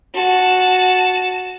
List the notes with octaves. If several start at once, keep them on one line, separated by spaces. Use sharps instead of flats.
F#4 A5